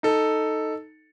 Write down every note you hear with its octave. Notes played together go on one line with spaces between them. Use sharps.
D#4 A4